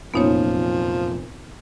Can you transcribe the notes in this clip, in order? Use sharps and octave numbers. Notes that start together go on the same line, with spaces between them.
F1 F#2 A#2 F3 B3 D#4 C#5